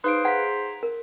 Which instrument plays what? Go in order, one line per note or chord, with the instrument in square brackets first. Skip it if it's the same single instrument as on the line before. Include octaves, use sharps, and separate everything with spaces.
[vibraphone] D#4 G#4 [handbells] B4 F5 D7 [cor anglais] C5
[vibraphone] G#4 [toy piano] F#5 [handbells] A#5 B6
[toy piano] A#4